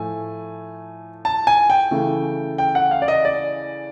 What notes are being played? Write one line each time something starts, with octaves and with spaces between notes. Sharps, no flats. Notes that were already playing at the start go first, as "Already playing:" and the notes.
Already playing: A2 F3 A3 G#5
A5
G#5
G5
C#3 E3 A3
G5
F#5
F5
D5
D#5
D5